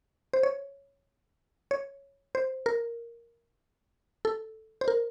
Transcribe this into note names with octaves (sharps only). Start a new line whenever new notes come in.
C5
C#5
C#5
C5
A#4
A4
C5
A#4